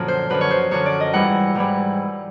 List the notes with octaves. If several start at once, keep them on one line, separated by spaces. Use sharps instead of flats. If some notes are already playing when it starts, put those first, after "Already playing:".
Already playing: F#2 A#2 D3 F3 D5
C5
F#2 D3 F3 B4
C#5
C5
F#2 D3 F3 C#5
D5
D#5
G#2 E3 G3 F#5
G#2 E3 G3